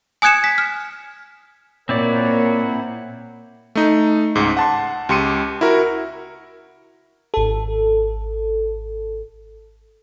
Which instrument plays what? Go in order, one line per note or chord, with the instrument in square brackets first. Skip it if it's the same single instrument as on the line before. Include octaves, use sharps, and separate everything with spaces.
[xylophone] G#5 D#6 F#6 G#6 C#7 E7
B6
F6
[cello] A#2 [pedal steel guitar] C4 E4 D5 [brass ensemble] A#4 F#5 [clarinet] C#5
[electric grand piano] A3 D#4
C#2 G#2
F#5 A5 C6
C#2 G4 C6 C#7 D#7
E4 F#4 A#4
[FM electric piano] G#1 A4